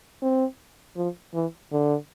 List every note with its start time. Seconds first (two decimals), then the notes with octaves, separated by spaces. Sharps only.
0.22 C4
0.96 F3
1.34 E3
1.72 D3